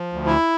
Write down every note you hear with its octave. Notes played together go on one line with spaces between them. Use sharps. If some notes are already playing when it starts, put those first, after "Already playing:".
Already playing: F3
D2
E4